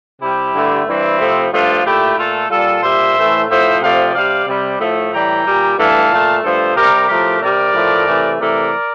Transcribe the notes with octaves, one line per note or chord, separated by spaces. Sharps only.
C3 G3 E4 G4
G2 D3 A3
G2 E3 G3 C4 E4
C3 F3 A3
G2 F3 A3 D4 F4
A#2 A3 E4 G4
A#2 A3 F4 A4
A#2 G3 F4 A4
A#2 G3 C5 E5
A2 E3 A3
A2 F3 A3 C5 E5
C3 F3 A3 D5 F5
C3 G3 D5 F5
C3 G3
A2 F3 A3
A2 E3 G3 G5 A#5
A#2 G3
G2 E3 A3 F5 A5
A#2 A3
G2 F3 A3 A4 C5
C3 G3 G4 A#4
A2 F3 A3 G4 A#4
C3 G3 A#4 D5
A2 F3 A3
C3 E3 A3
C3 E3 A3 A#4 D5